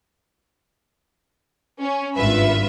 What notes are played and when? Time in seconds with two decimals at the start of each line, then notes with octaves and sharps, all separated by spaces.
1.81 C#4
2.17 G#1 G2 F4 B4 E5